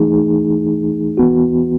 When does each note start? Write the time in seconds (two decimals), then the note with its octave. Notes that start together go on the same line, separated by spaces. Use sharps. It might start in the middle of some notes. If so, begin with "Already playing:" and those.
Already playing: E3 A3 D#4 G#4
1.18 E3 B3 F#4